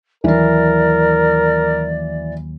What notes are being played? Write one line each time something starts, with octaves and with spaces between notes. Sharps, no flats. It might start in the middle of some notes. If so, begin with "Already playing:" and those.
D#2 E3 F#3 A#4 D5